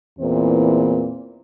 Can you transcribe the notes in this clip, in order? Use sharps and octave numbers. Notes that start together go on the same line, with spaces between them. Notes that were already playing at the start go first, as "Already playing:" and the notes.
E2 A#2 E3 C4